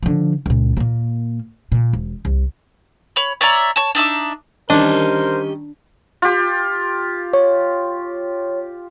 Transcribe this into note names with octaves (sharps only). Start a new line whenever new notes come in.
D3 F3
C#2 A#2
A#2 A#3
A#2
E1
C2
C#5 B5
C#5 D5 E5 A#5
C#5 A5
D4 D#4 E5 D6
D#3 G3 C#4 D4 G4 A#4 C5 D#5
F4 G4
C#5